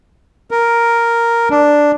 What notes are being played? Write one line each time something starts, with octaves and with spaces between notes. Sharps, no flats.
A#4
D4